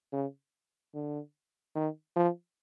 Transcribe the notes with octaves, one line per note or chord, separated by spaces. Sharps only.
C#3
D3
D#3
F3